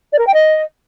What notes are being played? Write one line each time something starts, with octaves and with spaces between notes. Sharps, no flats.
D5
A#4
G5
D#5